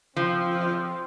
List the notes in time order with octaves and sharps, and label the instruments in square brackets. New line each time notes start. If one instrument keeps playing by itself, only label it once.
[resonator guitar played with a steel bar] F3 [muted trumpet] C4